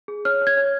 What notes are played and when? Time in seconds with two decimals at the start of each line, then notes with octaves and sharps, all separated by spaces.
0.08 G#4
0.25 C#5 F6
0.41 C#5
0.47 G#6
0.57 C#5